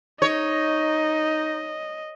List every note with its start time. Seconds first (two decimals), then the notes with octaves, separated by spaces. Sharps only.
0.22 D#4 C#5 D#5